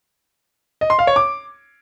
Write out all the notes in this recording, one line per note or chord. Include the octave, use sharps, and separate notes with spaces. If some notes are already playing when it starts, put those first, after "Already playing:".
D#5
C6
F5
C#5
D6